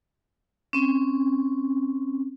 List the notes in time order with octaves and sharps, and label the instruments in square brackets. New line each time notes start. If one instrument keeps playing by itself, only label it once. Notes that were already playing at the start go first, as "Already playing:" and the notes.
[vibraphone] C4 C#4